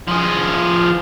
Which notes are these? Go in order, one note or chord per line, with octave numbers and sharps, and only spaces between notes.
F3 G#4